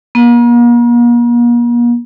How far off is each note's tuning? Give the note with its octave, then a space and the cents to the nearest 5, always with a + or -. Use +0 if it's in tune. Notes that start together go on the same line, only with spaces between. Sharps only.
A#3 +40